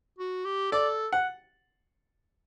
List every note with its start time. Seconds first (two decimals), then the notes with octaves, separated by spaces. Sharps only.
0.18 F#4
0.45 G4
0.72 A4 D5
1.12 F#5